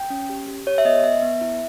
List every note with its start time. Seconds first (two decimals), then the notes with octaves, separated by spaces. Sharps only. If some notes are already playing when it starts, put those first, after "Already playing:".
Already playing: G5
0.10 C#4
0.30 G4
0.48 G4
0.67 G4 C#5
0.78 E5
0.85 B3 D#5
1.04 B3 E5
1.23 B3
1.41 E4